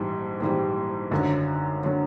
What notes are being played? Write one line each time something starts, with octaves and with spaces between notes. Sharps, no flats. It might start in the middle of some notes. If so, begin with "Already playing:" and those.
Already playing: A#1 G#2 E3 G3
A#1 G#2 E3 G3
G#1 F#2 D3 F#3
D3 F#3